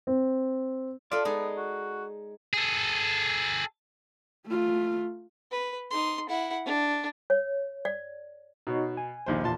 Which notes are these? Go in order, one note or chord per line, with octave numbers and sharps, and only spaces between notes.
C4
F4 A4 D5 E5
G#3 B3 D#4
F#4
G#4 A4
A3 F4
B4
D#4 C6
E4 F#5
D4
C#5
D5
B2 D#4 F#4 C#5
G#5
A#1 D#2 C5
E2 A#2 A5 C6